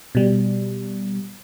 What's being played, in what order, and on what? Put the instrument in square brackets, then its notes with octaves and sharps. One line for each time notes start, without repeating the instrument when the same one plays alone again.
[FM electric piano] B2 G3